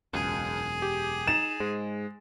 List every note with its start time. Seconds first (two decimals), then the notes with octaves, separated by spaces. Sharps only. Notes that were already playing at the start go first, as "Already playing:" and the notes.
0.13 E1 C#2 F#2 G#4
0.82 G4
1.27 D#4 A6 E7
1.60 G#2 G#3